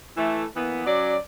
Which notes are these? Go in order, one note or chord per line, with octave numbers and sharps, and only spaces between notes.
E3 A3
E3 A#3 B3
F#3 C#4 D5